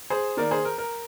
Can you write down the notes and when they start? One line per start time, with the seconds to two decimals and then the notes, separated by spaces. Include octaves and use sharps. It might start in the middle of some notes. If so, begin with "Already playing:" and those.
0.10 G#4 C5
0.37 D#3 A#3 A#4 D5
0.51 G#4 C5
0.65 A#4
0.78 A#4